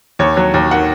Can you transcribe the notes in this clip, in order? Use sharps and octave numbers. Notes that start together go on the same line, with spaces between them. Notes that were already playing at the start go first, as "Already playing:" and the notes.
D#2 C#5
F#3
D#2
D#3 F#5